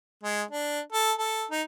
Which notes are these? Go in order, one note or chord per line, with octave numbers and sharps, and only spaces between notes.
G#3
D4
A4
A4
D#4